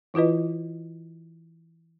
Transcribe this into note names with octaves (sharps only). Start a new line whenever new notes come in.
E3 E4 F4 B4 D#5